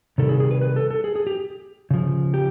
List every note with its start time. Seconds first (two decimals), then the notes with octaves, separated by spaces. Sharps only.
0.18 C3 D#3 G3 A4
0.29 G#4
0.40 G#4
0.51 B4
0.61 B4
0.76 A4
0.90 A4
1.04 G#4
1.16 G#4
1.27 G4
1.91 C#3 F3
2.34 G4